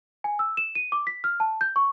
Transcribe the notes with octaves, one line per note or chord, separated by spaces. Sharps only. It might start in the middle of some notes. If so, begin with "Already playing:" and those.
G#5
E6
E7
D#7
D6
B6
F6
A5
G6
C#6